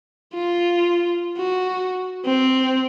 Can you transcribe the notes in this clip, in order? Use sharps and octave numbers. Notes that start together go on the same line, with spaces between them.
F4
F#4
C4